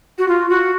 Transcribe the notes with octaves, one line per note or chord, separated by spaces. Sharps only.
F#4
F4
F#4